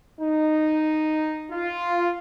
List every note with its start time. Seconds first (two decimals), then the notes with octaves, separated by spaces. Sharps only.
0.20 D#4
1.52 F4